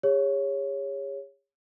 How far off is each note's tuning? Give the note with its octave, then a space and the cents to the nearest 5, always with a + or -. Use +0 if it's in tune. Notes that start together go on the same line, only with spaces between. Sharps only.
G#4 -45 C#5 +0